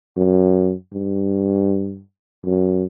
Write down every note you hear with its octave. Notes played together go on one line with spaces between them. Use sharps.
F#2
G2
F#2